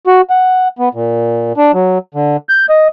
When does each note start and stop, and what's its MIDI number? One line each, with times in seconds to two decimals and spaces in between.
0.07 0.21 66
0.30 0.68 78
0.79 0.89 59
0.94 1.53 46
1.57 1.72 62
1.74 1.98 54
2.14 2.37 50
2.49 2.66 91
2.69 2.88 75